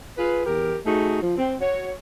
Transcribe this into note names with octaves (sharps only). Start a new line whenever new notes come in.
F4 G#4 B4
E2 G4 A#4
A3 D#4 F#4 G#4
F3
C4
F#4 C#5